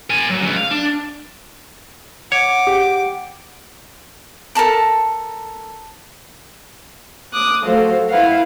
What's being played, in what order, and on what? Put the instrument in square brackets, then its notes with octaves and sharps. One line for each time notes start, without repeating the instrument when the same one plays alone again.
[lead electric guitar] A#4 G#5
F#3
C#2 C#3
F5
D4
[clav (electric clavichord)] C#5 [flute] F#5 [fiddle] D6
[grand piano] G4
[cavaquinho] A4 A#4 A5 B5
[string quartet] D6 D#6 F#6
F#3 A3 F#4 A4 C5 F5
E4 B4 F5 F#5